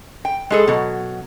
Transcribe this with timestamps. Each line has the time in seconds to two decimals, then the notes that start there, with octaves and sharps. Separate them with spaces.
0.25 G5
0.50 G#3 G#4 A4
0.67 B2 F#3